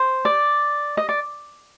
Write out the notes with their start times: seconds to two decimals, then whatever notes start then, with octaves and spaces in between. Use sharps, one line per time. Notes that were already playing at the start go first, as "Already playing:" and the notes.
Already playing: C5
0.25 D5
0.97 D#5
1.09 D5